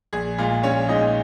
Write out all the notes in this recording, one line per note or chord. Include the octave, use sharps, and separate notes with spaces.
A#1 G#4
A#2 G#3 F4
A#1 C#4 C#5
A#2 G#3 D#4 D#5